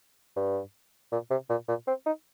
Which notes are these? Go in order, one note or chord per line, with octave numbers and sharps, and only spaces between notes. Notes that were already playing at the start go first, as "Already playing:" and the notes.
G2
A#2
C3
A#2
A#2
C4
D#4